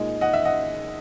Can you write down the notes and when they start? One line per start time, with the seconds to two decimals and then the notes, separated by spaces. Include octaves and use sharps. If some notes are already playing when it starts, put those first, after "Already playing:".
Already playing: A#2 G#3 D#4
0.21 D#5 F#5
0.33 E5
0.45 D#5 F#5